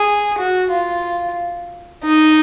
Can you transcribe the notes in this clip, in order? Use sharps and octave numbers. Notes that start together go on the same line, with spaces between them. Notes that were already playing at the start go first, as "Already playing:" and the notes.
Already playing: G#4
F#4
F4
D#4